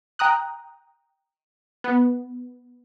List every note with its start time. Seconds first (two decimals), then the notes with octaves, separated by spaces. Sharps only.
0.19 G5 A#5 D#6 F#6
1.84 B3